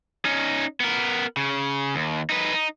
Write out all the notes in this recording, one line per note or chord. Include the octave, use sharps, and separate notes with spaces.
C#4 D#4
B3 A#4
C#3
D#2
D#4 B4
D#4